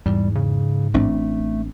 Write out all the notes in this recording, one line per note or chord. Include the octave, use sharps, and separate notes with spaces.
E2 G#2 G3
C#3
A1 A3 C4 D4